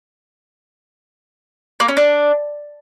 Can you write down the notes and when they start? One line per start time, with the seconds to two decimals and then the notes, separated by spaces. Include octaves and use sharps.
1.80 A#3
1.88 C#4
1.97 D4